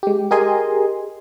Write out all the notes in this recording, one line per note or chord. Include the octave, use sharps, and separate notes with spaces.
G#3 G4
G4 G#4 A#4 D#5 G#5 C6